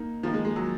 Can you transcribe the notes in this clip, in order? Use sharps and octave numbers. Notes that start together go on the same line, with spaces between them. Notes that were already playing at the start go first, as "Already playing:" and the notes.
Already playing: A#3 D#4
D#3 F3 A#3 D#4
G#3
G#3
F#3